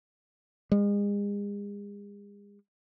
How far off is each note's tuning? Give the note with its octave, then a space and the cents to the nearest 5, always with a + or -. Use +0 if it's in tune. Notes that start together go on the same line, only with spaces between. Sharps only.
G#3 -40